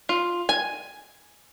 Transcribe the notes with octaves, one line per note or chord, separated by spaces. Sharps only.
F4
G#5